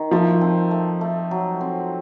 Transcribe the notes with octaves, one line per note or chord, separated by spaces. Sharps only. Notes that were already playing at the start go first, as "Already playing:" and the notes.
Already playing: D#3 D#4
F3 A3
C4
A3
A3
F#3
C4